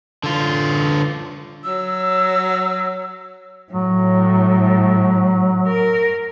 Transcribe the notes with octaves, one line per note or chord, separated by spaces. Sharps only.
D3 F4
F#3 E6
A2 F#3
A#4